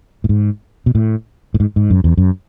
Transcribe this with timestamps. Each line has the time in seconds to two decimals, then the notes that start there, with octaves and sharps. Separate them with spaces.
0.24 A2
0.29 G#2
0.86 B2
0.95 A2
1.54 A2
1.60 G#2
1.76 G#2
1.90 F#2
2.04 E2
2.17 F#2